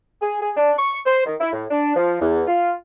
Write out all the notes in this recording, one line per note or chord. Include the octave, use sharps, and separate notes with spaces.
G#4
G#4
D4
C#6
C5
D#3
E4
A2
D4
F3
E2
F4